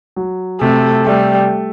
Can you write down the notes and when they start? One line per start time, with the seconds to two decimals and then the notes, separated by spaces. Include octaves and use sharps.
0.16 F#3
0.61 C3 A3
1.06 G3 A3